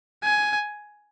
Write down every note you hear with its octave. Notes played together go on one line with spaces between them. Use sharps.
G#5